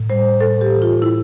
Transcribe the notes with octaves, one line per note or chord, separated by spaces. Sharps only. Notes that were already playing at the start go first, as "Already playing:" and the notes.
Already playing: A2
G3 C5
A2 A4
G4
E3
F4
A2 E4